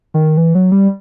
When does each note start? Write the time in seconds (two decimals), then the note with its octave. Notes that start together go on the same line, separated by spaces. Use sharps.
0.14 D#3
0.37 E3
0.55 F#3
0.72 G3